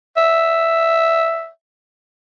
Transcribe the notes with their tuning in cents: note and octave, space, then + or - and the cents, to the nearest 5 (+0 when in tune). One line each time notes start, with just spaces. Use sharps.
E5 +0